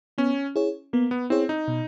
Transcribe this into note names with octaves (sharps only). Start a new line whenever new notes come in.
B3 C#4
E4 G#4 C#5
A#3 B3
B3
C4 E4 G#4 C#5
D#4
B2